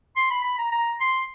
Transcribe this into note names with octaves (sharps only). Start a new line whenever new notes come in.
C6
B5
B5
A#5
A#5
C6